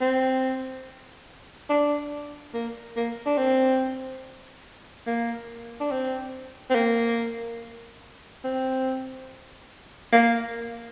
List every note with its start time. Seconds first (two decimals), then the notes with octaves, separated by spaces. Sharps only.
0.01 C4
1.69 D4
2.54 A#3
2.96 A#3
3.26 D4
3.38 C4
5.07 A#3
5.80 D4
5.91 C4
6.70 C4
6.75 A#3
8.44 C4
10.12 A#3